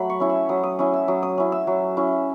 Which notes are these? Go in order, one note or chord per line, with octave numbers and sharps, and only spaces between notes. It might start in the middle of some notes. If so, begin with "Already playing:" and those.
Already playing: F#3 A3 F#5 B5
C#6
C#4 E4
E6
F#3 D#6
D#6
C#4 E4 D#6
E6
F#3 D#6
D#6
C#4 E4
E6
F#3
C#4 E4